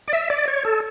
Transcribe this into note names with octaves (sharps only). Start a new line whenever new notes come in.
D5
E5
D5
C#5
A4